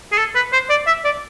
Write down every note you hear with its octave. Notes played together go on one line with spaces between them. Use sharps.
G#4
A4
B4
C5
D5
E5
D5